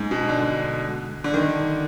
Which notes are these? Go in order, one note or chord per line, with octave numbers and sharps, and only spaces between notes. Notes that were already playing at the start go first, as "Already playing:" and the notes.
Already playing: G#2
B2
D3
D3
D#3